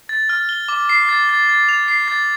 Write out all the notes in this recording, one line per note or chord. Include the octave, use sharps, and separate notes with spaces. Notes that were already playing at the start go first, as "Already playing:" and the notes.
A6
F6
G7
D6
C7
A6
A6
A6
F7
C7
A6